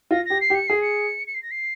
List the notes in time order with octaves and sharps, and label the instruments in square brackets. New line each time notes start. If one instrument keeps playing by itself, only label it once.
[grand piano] F4 [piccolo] A#6
[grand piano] G4 [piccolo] A#6
[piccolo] C7
[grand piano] G4
[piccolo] C#7
[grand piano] G#4 [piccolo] C7
[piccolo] C#7
C#7
C7
A#6
C7